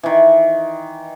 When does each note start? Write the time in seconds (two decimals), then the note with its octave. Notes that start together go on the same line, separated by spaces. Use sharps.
0.03 D#3 E3